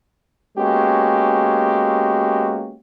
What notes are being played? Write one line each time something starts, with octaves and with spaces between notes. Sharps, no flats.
G#3 A#3 B3 C#4 F#4 G4